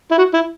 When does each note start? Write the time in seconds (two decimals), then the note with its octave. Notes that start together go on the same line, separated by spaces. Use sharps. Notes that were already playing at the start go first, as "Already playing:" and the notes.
0.11 E4
0.18 F#4
0.34 E4